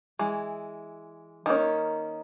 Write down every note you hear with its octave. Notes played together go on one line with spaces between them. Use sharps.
E3 G#3
D#3 A#3 C#4